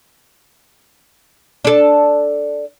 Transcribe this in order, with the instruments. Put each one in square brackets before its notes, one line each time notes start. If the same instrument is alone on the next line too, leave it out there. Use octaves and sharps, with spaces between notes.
[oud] D4 A4